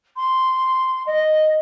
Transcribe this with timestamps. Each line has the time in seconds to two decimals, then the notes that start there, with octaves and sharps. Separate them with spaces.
0.16 C6
1.07 D#5